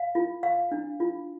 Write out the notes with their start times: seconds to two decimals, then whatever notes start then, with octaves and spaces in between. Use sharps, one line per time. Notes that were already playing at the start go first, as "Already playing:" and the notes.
Already playing: F5
0.15 F4
0.43 F5
0.72 D4
1.00 F4